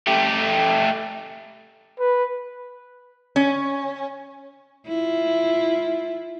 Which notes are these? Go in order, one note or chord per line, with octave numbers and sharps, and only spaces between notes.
A3 G4
B4
C#4
E4 F4